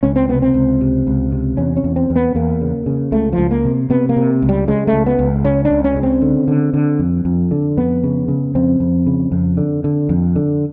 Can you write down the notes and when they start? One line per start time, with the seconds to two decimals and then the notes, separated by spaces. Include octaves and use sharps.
0.03 C#2 C#4
0.16 C4
0.29 C3 B3
0.42 C4
0.54 C#2
0.81 C3
1.07 C#2
1.32 C3
1.57 E2 C#4
1.77 C#4
1.84 E2
1.96 C4
2.10 E2
2.16 B3
2.35 E2 A#3
2.61 C#3
2.86 C#3
3.12 C#2 A3
3.33 F3
3.38 C#2
3.51 A#3
3.65 C3
3.90 C3 B3
4.09 A#3
4.16 C3
4.42 C#2
4.49 G3
4.68 C#3 G#3
4.87 A3
4.93 C#2
5.06 B3
5.19 C#2
5.44 C#3 C#4
5.65 D4
5.70 C#2
5.84 C#4
5.96 C#3
6.03 C4
6.22 D3
6.48 D3
6.74 D3
6.99 F2
7.25 F2
7.51 D3
7.77 F2 B3
8.04 C#3
8.28 C#3
8.55 F2 C4
8.80 F2
9.07 C#3
9.32 F2
9.57 D3
9.84 D3
10.09 F2
10.36 D3